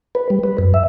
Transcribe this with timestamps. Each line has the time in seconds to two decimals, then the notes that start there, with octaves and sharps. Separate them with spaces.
0.15 B4
0.30 G3
0.44 B4
0.58 F#2
0.74 E5